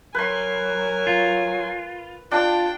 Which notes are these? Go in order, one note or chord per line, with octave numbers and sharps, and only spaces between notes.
F#3 A#4 B4 G#5 C6
F4
D4 F4 G5 A5